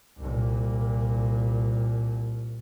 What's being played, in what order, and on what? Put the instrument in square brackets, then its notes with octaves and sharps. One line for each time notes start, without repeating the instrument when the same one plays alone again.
[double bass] C2 A#2